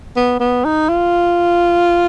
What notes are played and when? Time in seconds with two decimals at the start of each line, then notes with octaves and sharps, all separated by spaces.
0.16 B3
0.40 B3
0.64 D#4
0.89 F4